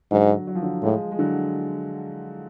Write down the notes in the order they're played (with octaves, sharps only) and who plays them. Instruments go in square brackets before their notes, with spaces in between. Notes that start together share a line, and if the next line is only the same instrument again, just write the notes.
[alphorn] G#2 [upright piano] D3 F#3
[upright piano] F#3
F3
D3 F#3
[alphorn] A2 [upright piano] F3 G#3
[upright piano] G#3
D3 F#3